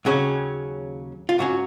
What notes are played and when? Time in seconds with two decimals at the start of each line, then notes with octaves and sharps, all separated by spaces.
0.05 D#2 C#3 F#3 C#4 G#4
1.29 F4
1.38 G#2 F#3 C#4 F#4